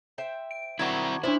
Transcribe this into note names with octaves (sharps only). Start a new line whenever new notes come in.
C5 E5 G5
D7
D#3 C4 D4 E4 F#4 C#6 G#6
F3 C#4 D4 E4 C5 D5